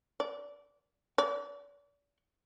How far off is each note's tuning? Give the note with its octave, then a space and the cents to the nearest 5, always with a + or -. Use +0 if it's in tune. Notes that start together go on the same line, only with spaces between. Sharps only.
D5 -20
D5 -40